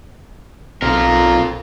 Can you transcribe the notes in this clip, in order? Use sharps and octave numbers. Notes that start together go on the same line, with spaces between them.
B1 F2 F4 A#4